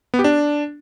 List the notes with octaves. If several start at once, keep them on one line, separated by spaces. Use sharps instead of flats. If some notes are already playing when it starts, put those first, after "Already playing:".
B3
G4
D4